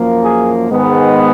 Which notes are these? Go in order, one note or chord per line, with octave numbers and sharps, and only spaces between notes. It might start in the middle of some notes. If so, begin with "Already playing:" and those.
Already playing: F#2 F3 A#3
G#4
G#2 D#3 G#3 B3